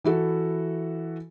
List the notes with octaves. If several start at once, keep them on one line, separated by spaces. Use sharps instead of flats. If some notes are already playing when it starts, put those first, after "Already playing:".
E3 E4 F#4 A4